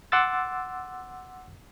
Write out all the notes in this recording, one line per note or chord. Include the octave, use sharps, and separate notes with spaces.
F#5 C6 D6 E6 A6